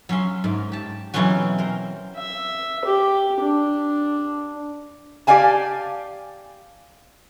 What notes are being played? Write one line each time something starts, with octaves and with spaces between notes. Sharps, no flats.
F#3 C#4 E5 C6
G#2 A#4
G4 A5
B2 E3 F#3 C4 C#4 F#4
A#4 C5
E5
G4
D4
G4 D5 F5 G#5 A5